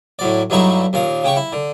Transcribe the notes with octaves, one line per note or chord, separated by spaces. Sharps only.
A2 F#3 D5
G2 F#3 A3 D#4 E4 C#6
D#2 A#2 F5 D#6
C#3 G4 C#6
E4
D3